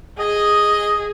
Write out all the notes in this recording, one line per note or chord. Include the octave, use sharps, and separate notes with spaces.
G#4 D#5